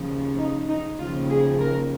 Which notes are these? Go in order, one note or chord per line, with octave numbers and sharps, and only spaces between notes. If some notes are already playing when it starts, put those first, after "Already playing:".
Already playing: D#2 C#3 F3
D#4
D#4
D#2 C#3 F3 F4
G#4
A#4